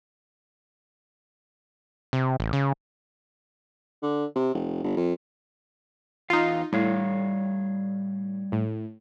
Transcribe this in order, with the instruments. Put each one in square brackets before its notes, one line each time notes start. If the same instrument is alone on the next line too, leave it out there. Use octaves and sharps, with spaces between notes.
[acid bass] C3
A1
C#3
[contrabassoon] D3
C3
F1
G1
F2
[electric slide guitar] E2 F5 [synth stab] D#4 F4
[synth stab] A2 [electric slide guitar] G3 C#5 F5
[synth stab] A2